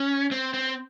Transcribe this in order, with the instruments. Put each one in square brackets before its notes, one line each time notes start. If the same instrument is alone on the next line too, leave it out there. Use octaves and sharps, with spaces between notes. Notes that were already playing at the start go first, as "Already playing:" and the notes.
Already playing: [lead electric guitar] C#4
C4
C4